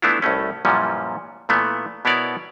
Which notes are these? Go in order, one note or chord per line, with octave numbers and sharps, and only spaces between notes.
E3 A3 B3 D4 E4 F4
C2 A2 A3 C#4
F#2 A#2 E3 F3 G3 C#4
A#2 E3 A3 B3
B2 B3 E4 A#4 C#5 D5